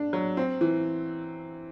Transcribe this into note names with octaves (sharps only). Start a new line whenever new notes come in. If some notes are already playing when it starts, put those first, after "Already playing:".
Already playing: D4
F#3
C4
E3